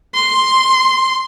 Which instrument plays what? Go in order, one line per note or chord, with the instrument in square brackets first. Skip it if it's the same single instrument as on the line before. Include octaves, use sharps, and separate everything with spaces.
[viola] C6